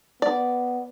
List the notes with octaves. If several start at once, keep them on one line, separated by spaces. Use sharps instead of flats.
B3 D5